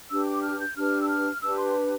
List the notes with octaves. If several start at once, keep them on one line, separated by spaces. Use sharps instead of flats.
D4 G4 B4 E6
D6
F6
G6
D4 G4 B4 F6
E6
F6
D4 G4 B4 E6
C6